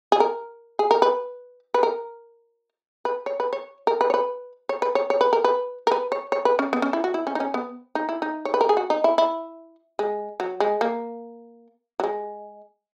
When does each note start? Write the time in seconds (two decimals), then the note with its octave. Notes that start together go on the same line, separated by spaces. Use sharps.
0.12 G#4
0.20 A#4
0.79 G#4
0.91 A#4
1.02 B4
1.74 B4
1.83 A#4
3.05 B4
3.26 C#5
3.40 B4
3.53 C#5
3.87 A#4
4.01 B4
4.10 C#5
4.14 B4
4.69 C#5
4.82 B4
4.95 C#5
5.10 C#5
5.21 B4
5.33 A#4
5.44 B4
5.87 A#4
5.92 B4
6.12 C#5
6.32 C#5
6.45 B4
6.59 C#4
6.73 B3
6.82 C#4
6.93 E4
7.04 F#4
7.14 E4
7.27 C#4
7.35 D#4
7.40 C#4
7.54 B3
7.95 D#4
8.09 E4
8.22 D#4
8.45 C#5
8.54 B4
8.61 A#4
8.69 G#4
8.77 F#4
8.90 D#4
9.04 E4
9.18 E4
9.99 G#3
10.40 F#3
10.60 G#3
10.81 A#3
12.00 F#3
12.04 G#3